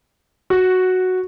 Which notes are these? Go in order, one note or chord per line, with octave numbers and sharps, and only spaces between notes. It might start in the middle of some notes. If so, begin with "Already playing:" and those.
F#4